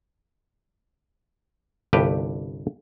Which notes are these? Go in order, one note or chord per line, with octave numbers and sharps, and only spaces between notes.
G1 C2 G2 G4 B4